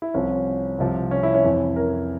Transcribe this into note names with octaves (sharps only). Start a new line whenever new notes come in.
E4
C2 C3 F3 C#4
C2 C3 F3
C#4
E4
C#4
F2 E3
A#4